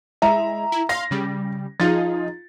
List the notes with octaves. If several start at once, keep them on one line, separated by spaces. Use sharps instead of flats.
G#3 E4 E5 A#5
E4
F5 C6 A#6
C#3 G3
F3 D#4 F4 G#4 A6